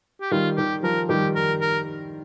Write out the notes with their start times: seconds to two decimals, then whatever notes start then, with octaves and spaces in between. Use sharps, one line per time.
0.21 G4
0.31 D#3 G3 F4
0.57 D#3 G4
0.83 F3 A#4
1.09 D#3 G3 G4
1.35 A#4
1.61 A#4